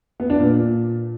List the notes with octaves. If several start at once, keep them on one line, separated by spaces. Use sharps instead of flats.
B3
D4
A#2